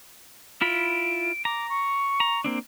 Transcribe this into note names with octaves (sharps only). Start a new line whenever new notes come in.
E4 F4 B5 D7
A#5 D6
C#6
A#5
A#3 C4 D4